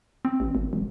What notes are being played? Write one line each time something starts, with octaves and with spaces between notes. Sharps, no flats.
C4
A1
G#1
E1